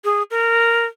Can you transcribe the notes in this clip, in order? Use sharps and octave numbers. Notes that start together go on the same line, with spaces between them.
G#4
A#4